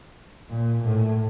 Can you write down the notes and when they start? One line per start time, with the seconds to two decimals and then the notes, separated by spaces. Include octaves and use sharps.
0.49 A#2
0.84 A2